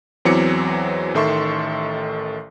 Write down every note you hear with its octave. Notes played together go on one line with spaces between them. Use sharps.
E2 E3 F#3 C4 D6 C#7
A1 D#3 A4 E5 C6 C#6